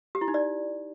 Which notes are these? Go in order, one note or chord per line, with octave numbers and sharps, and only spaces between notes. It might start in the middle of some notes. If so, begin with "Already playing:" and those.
G4
E4
D#4
D5